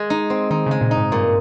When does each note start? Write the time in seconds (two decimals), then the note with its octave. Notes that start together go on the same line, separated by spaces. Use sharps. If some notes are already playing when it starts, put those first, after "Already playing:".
Already playing: G#3
0.10 D#4
0.30 C4
0.51 D#3 D#4
0.66 C#3
0.71 G#3
0.81 A#2
0.91 D#4
0.97 G#2
1.12 G2 A#2